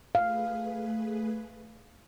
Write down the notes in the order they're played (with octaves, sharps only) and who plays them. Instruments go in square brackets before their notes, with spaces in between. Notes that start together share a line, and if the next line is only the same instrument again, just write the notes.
[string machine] A3 G#4 B4 [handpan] F5